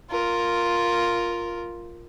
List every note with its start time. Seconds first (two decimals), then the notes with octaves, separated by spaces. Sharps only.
0.10 F4 A#4